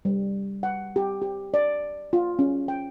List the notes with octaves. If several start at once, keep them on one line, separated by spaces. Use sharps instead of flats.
G3
F#5
G4
G4
D5
F4
C#4
G5